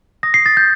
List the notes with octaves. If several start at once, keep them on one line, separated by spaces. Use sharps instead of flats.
D#6 A#6
C7
D#6 A6
G6